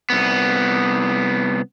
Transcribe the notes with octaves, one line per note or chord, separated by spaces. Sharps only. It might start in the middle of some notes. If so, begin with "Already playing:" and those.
C2 B3